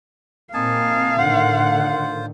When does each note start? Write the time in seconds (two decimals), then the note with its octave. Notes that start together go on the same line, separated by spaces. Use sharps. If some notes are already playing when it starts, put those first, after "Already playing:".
0.54 A#2 A#3 C4 D#4 F5 G#5 A5
1.18 A2 D3 D#3 F4 C5 F#5